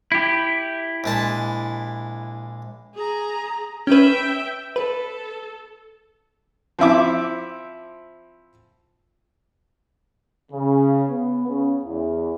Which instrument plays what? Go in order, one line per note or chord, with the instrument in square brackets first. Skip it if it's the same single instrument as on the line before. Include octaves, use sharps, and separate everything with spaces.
[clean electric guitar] E4 G4
[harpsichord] A#1 G#3 A5
[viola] G#4 A#5
[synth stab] C#4 B4 [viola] E5 G5
[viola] A4 [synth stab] B4
[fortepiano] F3 C4 E4 D6
[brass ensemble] C#3
B3
C#3
E2